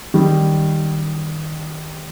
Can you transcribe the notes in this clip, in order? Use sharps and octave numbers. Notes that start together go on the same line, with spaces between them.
D#3 G3